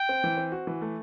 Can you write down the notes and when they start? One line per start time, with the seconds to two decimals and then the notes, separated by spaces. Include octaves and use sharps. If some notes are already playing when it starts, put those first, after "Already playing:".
Already playing: G5
0.09 C4
0.24 E3
0.38 C4
0.52 F#4
0.67 E3
0.82 A3